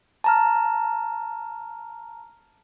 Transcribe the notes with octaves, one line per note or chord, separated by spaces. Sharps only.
A5 A#5 F6